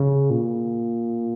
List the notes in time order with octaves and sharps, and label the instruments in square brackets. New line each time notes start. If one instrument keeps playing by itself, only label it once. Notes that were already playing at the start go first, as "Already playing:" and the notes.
Already playing: [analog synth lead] C#3
A#2